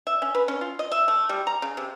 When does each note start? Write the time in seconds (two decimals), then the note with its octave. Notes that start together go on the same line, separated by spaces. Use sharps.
0.07 E5
0.22 C#4
0.35 B4
0.48 C#4
0.61 F4
0.79 D#5
0.92 E5
1.08 A3
1.29 G3
1.47 A#5
1.62 C#3
1.77 C3